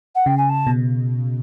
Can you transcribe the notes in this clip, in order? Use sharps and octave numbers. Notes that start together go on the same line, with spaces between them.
F#5
C#3 G5
G#5
A5
B2